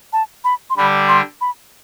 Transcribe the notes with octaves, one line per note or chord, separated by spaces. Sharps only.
A5
B5
C6
D3 G3 D4 B5
C6
B5